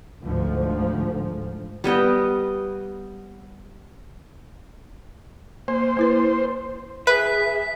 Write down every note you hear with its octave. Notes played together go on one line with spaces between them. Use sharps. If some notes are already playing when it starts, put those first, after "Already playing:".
D2 G#2 F3
G3 B3 D#5 G5
A#3 C5
A#3 E4 B4
G#4 B4 E5 B6